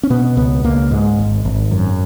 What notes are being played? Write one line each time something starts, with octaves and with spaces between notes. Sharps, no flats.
C#4
B2 B3
C#2 B3
C#2 A#3
G#2 G#3
G#1
G#1
F#2